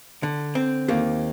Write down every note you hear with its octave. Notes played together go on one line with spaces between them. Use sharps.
D3
C4
D#2 A#3